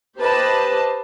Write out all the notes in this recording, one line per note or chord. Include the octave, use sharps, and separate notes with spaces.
G4 B4 C5 D#5 A5